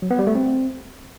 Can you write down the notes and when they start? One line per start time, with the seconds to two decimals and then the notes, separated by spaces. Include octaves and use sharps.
0.02 F#3
0.11 B3
0.19 G3
0.27 A3
0.35 C4